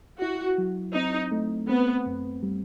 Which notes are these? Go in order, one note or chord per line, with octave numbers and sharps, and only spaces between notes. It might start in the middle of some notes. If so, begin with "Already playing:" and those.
E4 F#4
F#3
C4 D#4
A3
B3 C4
F#2
G3